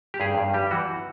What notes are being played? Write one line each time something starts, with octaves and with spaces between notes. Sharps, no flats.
G4
G2 G#4
G2
G3 G4
E3 F#4